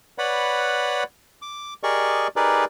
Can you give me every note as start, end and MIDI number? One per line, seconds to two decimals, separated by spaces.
0.18 1.03 71
0.18 1.03 73
0.18 1.03 74
0.18 1.03 78
0.18 1.03 83
1.42 1.74 86
1.83 2.28 67
1.83 2.28 68
1.83 2.28 70
1.83 2.28 74
1.83 2.28 75
1.83 2.28 85
2.36 2.65 63
2.36 2.65 67
2.36 2.65 68
2.36 2.65 70
2.36 2.65 71
2.36 2.65 74